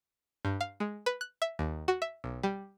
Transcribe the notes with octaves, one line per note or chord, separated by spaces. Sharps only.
G2
F5
G#3
B4
F#6
E5
D#2
F#4
E5
B1
G3